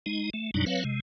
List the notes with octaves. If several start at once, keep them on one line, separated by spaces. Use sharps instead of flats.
G#3 D#4
A3
F#2 B2 F#3 G3 D4 D#4
F#3 C4 B4 C#5 F5
C3 G#3